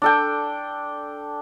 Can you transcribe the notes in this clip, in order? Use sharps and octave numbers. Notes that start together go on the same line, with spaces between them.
D4 A4 G5